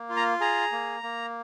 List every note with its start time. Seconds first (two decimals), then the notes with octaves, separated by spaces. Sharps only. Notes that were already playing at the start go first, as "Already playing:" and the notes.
Already playing: A#3
0.09 F4
0.17 A#5
0.40 G#4 A#5
0.72 A#3
1.03 A#3